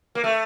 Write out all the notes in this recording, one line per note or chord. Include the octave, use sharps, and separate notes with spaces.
A#3
A3